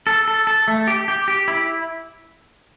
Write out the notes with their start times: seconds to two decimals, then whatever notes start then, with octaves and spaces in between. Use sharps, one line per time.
0.07 A4
0.28 A4
0.47 A4
0.68 A3
0.87 G4
1.08 G4
1.28 G4
1.48 E4